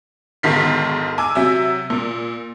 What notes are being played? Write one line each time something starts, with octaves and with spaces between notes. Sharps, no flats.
B1 G#2 D3 D#3 B6 C7
G#5 D6 E6
C3 F#3 E5 E6
A#2